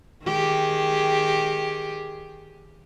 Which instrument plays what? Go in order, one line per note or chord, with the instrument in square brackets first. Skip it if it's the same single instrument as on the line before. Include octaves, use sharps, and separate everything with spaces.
[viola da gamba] D#3 G4 G#4